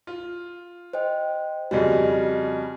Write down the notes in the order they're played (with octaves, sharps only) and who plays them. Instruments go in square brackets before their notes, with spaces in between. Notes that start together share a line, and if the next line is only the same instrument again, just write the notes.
[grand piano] F4
[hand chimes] C5 D#5 G5
[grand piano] F2 C#3 G3 [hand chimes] F#4 D#5